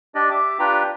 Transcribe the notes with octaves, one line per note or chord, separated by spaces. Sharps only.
D4 G4 D5 D#5
G4 E5 D6
D4 F4 G4 B4 G5 A#5